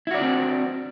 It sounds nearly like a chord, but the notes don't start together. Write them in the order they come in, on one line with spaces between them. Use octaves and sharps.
E4 F#4 D5 D4 C4